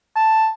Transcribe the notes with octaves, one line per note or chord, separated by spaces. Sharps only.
A5